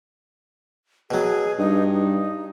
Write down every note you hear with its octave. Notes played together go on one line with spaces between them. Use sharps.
B2 F#3 G#4
G2 D#4
D#4